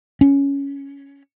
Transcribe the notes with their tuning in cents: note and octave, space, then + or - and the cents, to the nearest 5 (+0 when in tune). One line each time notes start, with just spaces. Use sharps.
C#4 +10